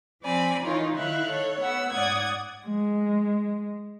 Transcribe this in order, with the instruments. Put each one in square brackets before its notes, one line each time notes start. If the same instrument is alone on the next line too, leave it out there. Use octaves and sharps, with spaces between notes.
[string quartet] F3 C4 D5 G#5 B5
E3 D#4 F4 A#4 C#5
D#3 E4 E5 F5 F#6
A4 C#5
B3 F#5 E6
G#2 D5 F#5 D#6 G#6
G#3